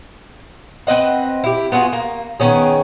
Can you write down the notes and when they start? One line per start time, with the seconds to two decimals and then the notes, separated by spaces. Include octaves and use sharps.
0.87 C4 B4 D#5 F#5
1.44 E4 G4
1.72 B3 F4 F#4 G#4
1.93 A#3
2.40 D#3 B3 C#4 G#4